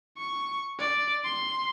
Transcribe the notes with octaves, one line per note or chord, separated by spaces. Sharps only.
C#6
D5
C6